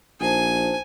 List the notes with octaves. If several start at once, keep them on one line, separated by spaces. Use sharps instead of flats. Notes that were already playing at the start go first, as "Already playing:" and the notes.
A#1 D#4 C5 G#5 A5